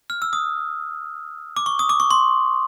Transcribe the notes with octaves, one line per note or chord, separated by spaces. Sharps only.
F6
E6
D#6
D6
C#6
D#6
D6
C#6
C6